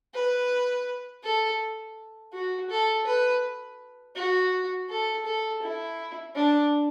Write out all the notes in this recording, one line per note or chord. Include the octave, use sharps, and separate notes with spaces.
B4
A4
F#4
A4
B4
F#4
A4
A4
E4
D4